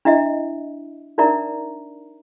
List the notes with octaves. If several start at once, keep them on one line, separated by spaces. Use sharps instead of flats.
D4 E4 D#5 E5
D4 D#4 A#4 D5 E5 A#5